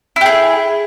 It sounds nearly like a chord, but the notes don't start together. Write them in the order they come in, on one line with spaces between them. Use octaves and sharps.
E4 G4 G#4